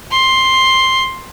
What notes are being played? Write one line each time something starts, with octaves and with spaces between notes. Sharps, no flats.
C6